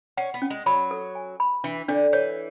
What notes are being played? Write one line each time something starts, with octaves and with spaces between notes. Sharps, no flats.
C#4 F#5
B3
C#4
G#3
F#3 B5
A4
G#5
B5
E3 D4
D3 D4
E3 C#5